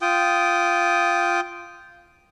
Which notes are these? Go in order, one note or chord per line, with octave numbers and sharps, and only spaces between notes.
F4 G5 D#6